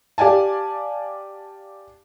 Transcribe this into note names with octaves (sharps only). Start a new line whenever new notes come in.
G4 D5 F5 G#5 A5